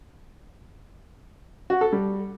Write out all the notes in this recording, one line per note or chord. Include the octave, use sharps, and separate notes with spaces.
F#4
A4
G3